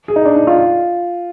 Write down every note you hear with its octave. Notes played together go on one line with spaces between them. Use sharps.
G#4
D#4
D4
D#4
F4